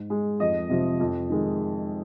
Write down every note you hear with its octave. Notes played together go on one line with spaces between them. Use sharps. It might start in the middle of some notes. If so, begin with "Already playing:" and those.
Already playing: G#2
G#3
F2 D#5
C3 F3
F2
D#3 G#3